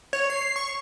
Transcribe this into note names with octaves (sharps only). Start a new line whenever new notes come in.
C#5
C7
C#6